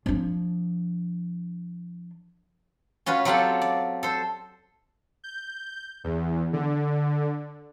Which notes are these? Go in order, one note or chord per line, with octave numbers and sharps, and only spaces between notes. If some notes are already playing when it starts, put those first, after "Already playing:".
F3 D4
C#4 F4 F#4 B4
F#3 C4 F4 G4 A4 F#5
D5
A4 C5
G6
E2
D3